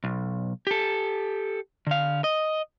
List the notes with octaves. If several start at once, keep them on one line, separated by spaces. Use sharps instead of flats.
B1
G4 A4
D3 F5
D#5